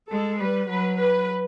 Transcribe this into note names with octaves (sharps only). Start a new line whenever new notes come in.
G#3 A4
G3 B4
F#3 B4
B4